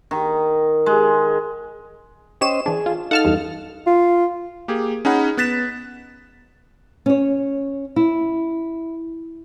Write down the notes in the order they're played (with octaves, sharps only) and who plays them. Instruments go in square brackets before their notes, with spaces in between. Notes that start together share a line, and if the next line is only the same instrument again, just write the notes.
[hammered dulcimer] D#3
G#3
[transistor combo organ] C#4 C5 D#5 [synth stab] G4 C#5 E7
[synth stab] E3 D4 [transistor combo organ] G#4
[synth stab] F4
[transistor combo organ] D#4 A4 F5 [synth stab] F#5 A5 F6
[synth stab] E2 G2
[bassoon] F4
[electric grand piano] A#3 G4 G#4
C#4 D#4 G#4 F#5 B5
B3 F#6 A6 B6 E7
[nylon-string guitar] C#4 C#5
E4